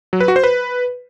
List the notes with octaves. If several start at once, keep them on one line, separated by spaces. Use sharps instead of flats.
F#3
B4
F#4
C5
B4